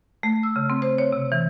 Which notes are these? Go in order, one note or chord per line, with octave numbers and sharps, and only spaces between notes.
A3
E6
C#3
C4
C5
C#5
C3
E3